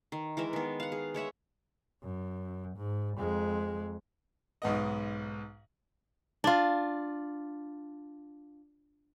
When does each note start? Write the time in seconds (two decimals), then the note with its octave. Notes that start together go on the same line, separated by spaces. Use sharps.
0.12 D#3
0.37 E3 G#3 A#4 E5
0.53 D#3 B3
0.80 F5 F#5
0.92 G#4
1.14 G#3 C#5 E5 F#5
2.02 F#2
2.77 G#2
3.18 F2 G#3
4.62 B1 G#2 B3 D#5
6.44 D4 F4